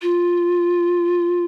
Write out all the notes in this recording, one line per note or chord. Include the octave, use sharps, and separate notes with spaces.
F4